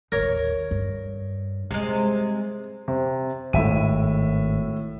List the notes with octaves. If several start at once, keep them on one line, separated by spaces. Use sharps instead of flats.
A1 D#2 A#4 C#5
G2
C3 G3 G#3
C3
G#1 A2 E5 D#7